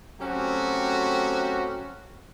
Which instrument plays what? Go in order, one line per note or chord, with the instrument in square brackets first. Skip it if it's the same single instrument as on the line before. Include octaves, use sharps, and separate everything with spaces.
[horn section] F#3 A3 C4 C#4 F#4 G4